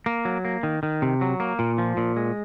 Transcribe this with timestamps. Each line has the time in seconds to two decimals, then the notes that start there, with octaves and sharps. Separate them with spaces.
0.06 A#3
0.25 F#3
0.45 A#3
0.63 D#3
0.83 D#3
1.02 C3
1.21 F#3
1.40 A#3
1.59 A#2
1.78 F3
1.97 A#2
2.16 G#3